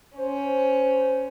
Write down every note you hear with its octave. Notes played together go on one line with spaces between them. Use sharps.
C#4 C5